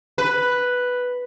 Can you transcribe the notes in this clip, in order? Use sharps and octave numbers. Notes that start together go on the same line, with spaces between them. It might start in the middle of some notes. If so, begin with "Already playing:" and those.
B4